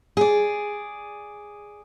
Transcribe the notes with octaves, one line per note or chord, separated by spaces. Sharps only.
G#4 D5